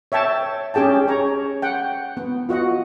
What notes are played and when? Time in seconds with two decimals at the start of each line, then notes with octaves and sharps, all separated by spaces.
0.12 C#5 E5 G5 A5
0.74 C#4 G4 G#4 G5 A5
1.08 C#5 A#5
1.62 F#5 G5
2.17 B3
2.49 F4 F#4 D#5 F#5